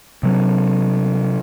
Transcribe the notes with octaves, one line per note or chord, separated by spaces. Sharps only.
C3 F#3